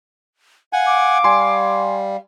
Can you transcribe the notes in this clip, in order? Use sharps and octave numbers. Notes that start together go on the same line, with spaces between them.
F5 F#5 G#5
D6
G3 G#5 C6